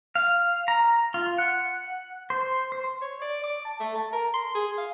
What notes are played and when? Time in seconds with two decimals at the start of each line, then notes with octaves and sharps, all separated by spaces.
0.15 F5
0.68 A#5
1.14 F4
1.38 F#5
2.30 C5
2.72 C5
3.02 C#5
3.22 D5
3.44 D6
3.65 A5
3.80 A3
3.96 A5
4.13 A#4
4.34 C6
4.55 G#4
4.78 F5